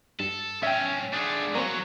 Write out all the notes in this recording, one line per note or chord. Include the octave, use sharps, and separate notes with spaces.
G2 A4
B1 A2 C#4 E5 G5
A3 D4 G#4
E3 F#3 A#3 C4 C#5